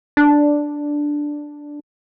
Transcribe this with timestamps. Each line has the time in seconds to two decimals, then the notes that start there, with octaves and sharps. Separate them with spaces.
0.17 D4